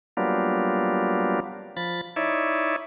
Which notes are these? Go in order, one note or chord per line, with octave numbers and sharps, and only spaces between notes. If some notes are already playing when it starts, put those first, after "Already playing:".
F#3 G3 A#3 B3 D4 F4
F3 B5 A6
D#4 E4 C#5 D5 E5